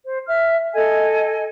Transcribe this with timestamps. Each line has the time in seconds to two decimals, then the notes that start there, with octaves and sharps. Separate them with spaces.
0.04 C5
0.27 E5 F6
0.74 A4 D#5 G#5